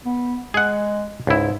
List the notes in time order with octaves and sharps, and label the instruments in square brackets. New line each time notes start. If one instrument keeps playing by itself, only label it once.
[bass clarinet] B3
[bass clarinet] G#3 [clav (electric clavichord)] G#4 F#5
[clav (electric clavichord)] C#2 E4 [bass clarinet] G#2